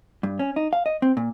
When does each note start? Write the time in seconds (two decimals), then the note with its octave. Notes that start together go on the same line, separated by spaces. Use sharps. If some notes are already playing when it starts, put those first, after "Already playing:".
0.23 G2
0.39 C#4
0.56 D#4
0.73 F5
0.86 D#5
1.02 C4
1.17 A#2